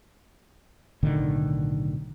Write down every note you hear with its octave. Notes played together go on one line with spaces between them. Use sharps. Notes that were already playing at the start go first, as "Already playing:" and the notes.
B1 A2 D3 D#3